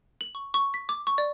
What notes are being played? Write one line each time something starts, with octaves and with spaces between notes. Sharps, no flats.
F#7
C#6
C#6
B6
D6
C#6
D5